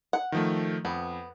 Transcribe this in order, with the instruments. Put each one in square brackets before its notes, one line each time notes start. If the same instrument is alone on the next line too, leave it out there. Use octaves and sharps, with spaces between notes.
[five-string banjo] F#5
[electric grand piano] D#3 F3 A3
[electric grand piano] F2 [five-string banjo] B3